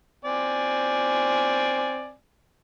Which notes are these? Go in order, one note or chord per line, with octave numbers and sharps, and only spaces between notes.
C4 D5 G#5